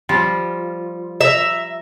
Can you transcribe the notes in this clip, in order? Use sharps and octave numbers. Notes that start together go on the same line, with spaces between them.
F3 G3 F4
E5 A#5